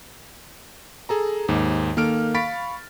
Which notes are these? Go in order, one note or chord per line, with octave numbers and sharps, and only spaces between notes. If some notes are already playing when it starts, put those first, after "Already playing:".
G#4 A4 A#5
D#2 G#2
D#3 A#3 A4 F6 D7
F5 B5 C#6 A6 B6 D7